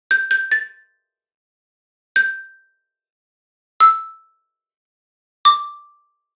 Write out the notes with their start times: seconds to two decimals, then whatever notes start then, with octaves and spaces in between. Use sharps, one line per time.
0.11 G6
0.31 G6
0.52 A6
2.16 G6
3.80 E6
5.45 D6